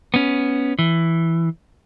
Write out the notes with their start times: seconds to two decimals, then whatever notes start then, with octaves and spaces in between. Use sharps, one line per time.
0.14 B3 C#4
0.79 E3